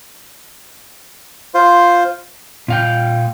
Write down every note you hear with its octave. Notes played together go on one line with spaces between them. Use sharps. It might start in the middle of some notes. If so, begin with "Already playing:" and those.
F4 C5
A#2 F5 G5